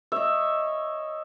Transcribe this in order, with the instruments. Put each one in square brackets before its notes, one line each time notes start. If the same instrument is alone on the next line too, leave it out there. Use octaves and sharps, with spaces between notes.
[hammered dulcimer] C#5 D#5 [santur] E5